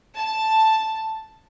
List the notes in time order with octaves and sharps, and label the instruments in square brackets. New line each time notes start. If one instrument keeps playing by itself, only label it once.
[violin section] A5